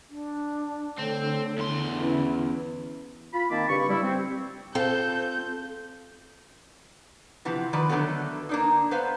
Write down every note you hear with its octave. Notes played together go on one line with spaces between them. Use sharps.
D4
D3 A3 C4 A4 C#5
E2 C6
C#4 E4 B4
F4 B5
D#3 A#3 C4 A5 B5 D6
G2 C#3 B5 C#6
G3 E4
C4
C4 F4 A4 G6
C3 E3 F3 B3
D#3 F3 B4 D5
D3 D#3 F#3 A3 B3
A#3 D4 D#4
B3 B4 C5 F5